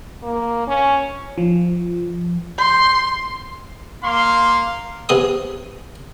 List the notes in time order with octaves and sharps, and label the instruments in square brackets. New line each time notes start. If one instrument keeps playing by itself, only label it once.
[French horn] A#3
C#4
[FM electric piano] F3
[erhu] C6 [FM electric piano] G6
[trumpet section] A#3 F5 C6
[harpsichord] C3 B3 G#4 C6 D#6